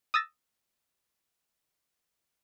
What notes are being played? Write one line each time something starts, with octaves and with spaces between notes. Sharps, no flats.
D#6 E6 A6 A#6